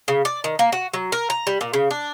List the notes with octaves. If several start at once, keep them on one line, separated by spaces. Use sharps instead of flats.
C#3
D5
D#3
A#3
F#4
F#3
A#4
A#5
G3
A#2
C#3
D4